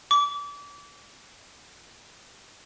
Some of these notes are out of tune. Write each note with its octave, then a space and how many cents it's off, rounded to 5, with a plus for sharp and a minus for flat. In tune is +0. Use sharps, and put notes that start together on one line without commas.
D6 -30